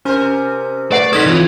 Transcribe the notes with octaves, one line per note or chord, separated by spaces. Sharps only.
C3 C#4 A#4 C5
A3 B4 D5 F#5 C7
D#4 A4 D#6 G#6 A#6 B6
E3 C4 F4 C#5